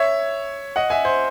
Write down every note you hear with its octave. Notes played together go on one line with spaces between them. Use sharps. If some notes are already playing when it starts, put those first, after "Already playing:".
Already playing: C#5 E5
D#5 F#5
E5 G#5
C5